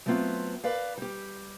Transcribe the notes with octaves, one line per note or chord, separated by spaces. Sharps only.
F#3 A3 B3 C4 F4
A#4 B4 D5 F5
G3 G4